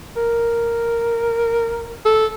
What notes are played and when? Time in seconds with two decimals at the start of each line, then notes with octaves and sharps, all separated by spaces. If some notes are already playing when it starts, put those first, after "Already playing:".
0.17 A#4
2.05 A4